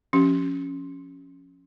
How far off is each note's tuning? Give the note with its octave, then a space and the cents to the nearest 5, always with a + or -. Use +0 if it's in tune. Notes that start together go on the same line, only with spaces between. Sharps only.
F3 +0 C#4 +0 G4 -25